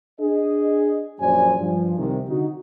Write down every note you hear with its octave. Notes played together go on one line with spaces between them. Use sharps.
D4 G#4 D#5
A#1 F#2 F#3 C5 D5 G#5
G2 F3
C2 C3 D#3
D3 D#4 F#4